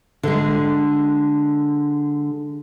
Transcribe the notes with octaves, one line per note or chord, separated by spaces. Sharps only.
D3 G#3